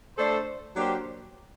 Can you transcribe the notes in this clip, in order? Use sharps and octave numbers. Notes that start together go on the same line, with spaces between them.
A3 D4 A4 C5
F#3 A#3 D4 G4 C5